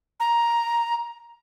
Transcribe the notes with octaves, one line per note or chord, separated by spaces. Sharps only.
A#5